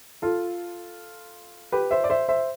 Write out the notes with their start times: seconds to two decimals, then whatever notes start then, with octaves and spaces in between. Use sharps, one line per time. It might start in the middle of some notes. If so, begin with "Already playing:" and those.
0.22 F4 A4
1.72 G4 B4
1.91 C5 E5
2.04 D5
2.10 C5 E5
2.29 C5 E5